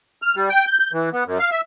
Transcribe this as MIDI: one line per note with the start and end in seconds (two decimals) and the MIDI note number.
0.22 0.35 89
0.36 0.49 55
0.49 0.65 79
0.66 0.79 91
0.79 0.91 91
0.93 1.09 52
1.13 1.24 59
1.26 1.38 42
1.39 1.50 77
1.51 1.61 76